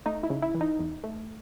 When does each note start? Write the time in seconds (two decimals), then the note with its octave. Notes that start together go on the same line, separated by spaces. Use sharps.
0.06 A3 D#4
0.23 E4
0.30 C#3
0.42 E4
0.54 E3
0.61 D#4
0.79 E2
1.04 A3